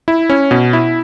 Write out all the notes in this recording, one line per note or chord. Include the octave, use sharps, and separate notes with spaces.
E4
C#4
B2
E4